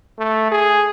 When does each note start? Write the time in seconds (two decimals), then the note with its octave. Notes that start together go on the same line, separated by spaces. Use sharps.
0.19 A3
0.52 G#4